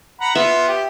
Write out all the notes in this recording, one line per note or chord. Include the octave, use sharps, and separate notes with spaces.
F#5 A#5 B5
B3 F4 E5
G4